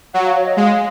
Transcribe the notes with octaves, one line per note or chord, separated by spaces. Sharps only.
F#3 F#5
F5
C#5
D#5
G#3 F5